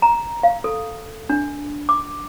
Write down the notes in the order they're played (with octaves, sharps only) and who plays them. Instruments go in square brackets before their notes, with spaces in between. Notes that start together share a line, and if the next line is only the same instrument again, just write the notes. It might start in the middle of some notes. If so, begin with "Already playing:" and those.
[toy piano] A#5
F5
A4
D4
D6